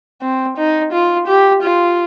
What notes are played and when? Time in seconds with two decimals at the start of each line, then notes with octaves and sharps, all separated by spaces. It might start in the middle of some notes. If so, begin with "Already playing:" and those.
0.21 C4
0.57 D#4
0.93 F4
1.28 G4
1.63 F4